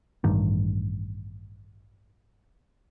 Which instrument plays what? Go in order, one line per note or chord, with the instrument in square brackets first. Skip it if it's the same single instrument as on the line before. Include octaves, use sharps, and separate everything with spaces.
[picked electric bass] A1 G2 D#3